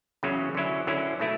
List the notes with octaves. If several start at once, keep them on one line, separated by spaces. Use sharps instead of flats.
E2 C#3 F#3 C#4
D3 F#3 C#4 E4
D3 F#3 C#4 E4
B2 A3 E4